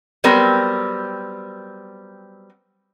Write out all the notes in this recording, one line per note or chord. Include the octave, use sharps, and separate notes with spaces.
F#3 G3 B3 C4 A#4